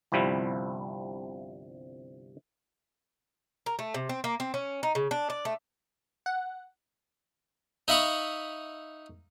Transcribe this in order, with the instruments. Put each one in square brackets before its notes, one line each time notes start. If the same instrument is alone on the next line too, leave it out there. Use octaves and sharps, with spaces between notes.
[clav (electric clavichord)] G1 C2 C3 F3 G3 E4
[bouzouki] A#4
A3
C3
C4
A#3
C4
C#4
D#4
C#3
D4
D5
A3
[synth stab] F#5
[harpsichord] D#4 E5 F5 B5 C#6 D#6